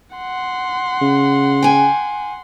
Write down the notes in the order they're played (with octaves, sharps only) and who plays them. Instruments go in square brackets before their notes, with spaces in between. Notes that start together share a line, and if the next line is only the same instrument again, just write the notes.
[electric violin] F#5 C6
[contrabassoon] C#3
[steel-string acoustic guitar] G5 G#5